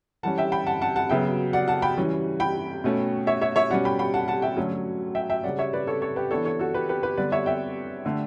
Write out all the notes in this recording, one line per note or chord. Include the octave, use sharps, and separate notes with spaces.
E3 G3 C#4 F#5 A5
E5 G5
G5 B5
F#5 A5
F#5 A5
F#5 A5
C#3 F#3 B3 E5 G5
D5 F#5
F#5 A5
G5 B5
E3 G3 C#4
G5 B5
B2 A3 C#4
C#5 E5
C#5 E5
C#5 E5
B2 G3 C#4 D5 F#5
G5 B5
G5 B5
F#5 A5
F#5 A5
E5 G5
D3 F#3 A3 C#4
E5 G5
E5 G5
C#3 G3 C#4 D5 F#5
C#5 E5
B4 D5
A4 C#5
A4 C#5
G4 B4
E3 B3 D4 A4 C#5
A4 C#5
F#4 A4
G4 B4
G4 B4
G4 B4
D3 G3 B3 D4 B4 D5
C#5 E5
E5 G5
D3 A3 D4